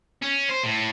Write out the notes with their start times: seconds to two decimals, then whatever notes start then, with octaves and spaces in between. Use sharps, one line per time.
0.22 C#4
0.50 C5
0.64 A2